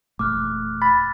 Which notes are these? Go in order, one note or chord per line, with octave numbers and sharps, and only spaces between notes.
E1 A#2 A3 D6 F6 F#6
B5 A6